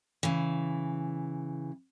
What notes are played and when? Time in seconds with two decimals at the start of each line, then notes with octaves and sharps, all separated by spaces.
0.23 C#3 E3